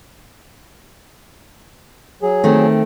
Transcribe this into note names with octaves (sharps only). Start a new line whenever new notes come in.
F#3 G#4
D#3 A3 C4